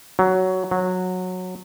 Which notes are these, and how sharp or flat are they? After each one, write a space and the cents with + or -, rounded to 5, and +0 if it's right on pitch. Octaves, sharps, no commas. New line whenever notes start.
F#3 +10
F#3 -15